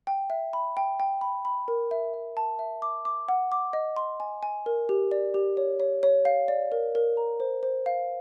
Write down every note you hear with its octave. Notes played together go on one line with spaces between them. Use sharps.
G5
E5
B5
G5
G5
B5
B5
A#4
E5
E5
A5
E5
D6
D6
F#5
D6
D#5
C6
G#5
G#5
A#4
G4
D5
G4
C#5
C#5
C#5
F5
D5
A#4
A#4
A#5
C5
C5
F5